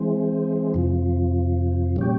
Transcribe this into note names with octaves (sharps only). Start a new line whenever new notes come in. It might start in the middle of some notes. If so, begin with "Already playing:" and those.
Already playing: E3 G#3 C4
F2 C3 F3
A#2 G3 C#4 G4